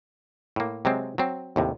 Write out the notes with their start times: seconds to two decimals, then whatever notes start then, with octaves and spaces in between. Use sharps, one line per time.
0.56 A2 A#3
0.85 C3 F#3 G#3 C4
1.18 F#3 C4
1.56 D#2 A2 C3